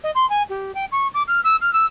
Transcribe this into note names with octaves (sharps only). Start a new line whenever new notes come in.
D#5
C6
G#5
G4
G5
C#6
D6
F6
E6
F6
E6